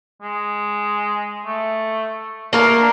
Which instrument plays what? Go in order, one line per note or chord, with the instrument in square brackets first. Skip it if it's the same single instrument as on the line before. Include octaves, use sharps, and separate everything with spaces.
[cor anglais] G#3
A3
[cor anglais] A3 [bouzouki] A#3 A#4
[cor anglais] D4